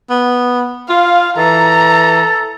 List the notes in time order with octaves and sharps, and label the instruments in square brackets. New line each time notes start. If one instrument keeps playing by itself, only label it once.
[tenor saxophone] B3
[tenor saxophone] F4 [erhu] F5
[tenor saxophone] E3 [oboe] A4 [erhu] A#5